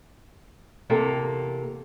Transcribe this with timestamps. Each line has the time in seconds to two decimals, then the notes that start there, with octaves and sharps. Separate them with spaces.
0.90 E2 C3 A#3 A4 A#5